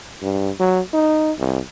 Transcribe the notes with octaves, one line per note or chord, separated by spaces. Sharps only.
G2
F#3
D#4
C2